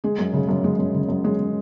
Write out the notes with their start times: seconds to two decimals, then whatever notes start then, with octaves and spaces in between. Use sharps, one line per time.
0.04 G#3 G#4
0.19 F#2
0.33 C#3
0.49 F#2
0.64 G#3
0.79 F#2
0.95 C#3
1.09 F#2
1.24 G#3